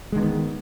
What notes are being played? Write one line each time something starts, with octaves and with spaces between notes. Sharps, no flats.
D3 D#3 G#3 B3